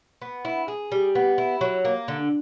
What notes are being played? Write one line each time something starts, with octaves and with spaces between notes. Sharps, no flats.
B3
E4
G#4
G3
B3
E4
F#3
A#3
D3